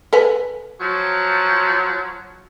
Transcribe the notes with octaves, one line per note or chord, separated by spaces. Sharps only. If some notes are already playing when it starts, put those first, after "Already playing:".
A4 B4 G#5
F3 F#3